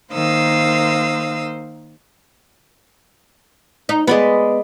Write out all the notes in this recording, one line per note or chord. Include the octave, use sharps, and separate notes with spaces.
D#3 A#3 C5 F5 D#6 E6
D#4
G#3 B3 D5 B5